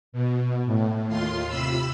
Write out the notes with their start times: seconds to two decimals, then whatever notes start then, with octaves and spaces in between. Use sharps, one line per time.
0.12 B2
0.65 A2
1.08 D#2 F4 C6
1.48 C3 B5 E6